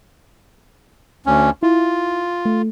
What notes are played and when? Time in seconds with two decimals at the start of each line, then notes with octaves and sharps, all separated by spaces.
1.26 D2 C#4
1.63 E4 F4
2.45 A3